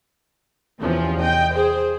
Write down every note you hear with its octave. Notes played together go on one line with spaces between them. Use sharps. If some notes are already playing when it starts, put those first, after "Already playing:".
E2 C3 F3 C#4
D#5 G5
G#4 C5